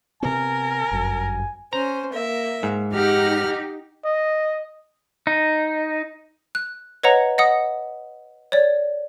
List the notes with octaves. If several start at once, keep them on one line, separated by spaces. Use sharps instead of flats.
C3 B3 A#4 G#5
G1 F#2
C#4 C5 A#5
A#3 E5
G#2
D#4 G4 F#5 F6
D#5
D#4
F#6
B4 C#5 D#5 F#5 A#5
D#5 F#5 D#6
C#5 D5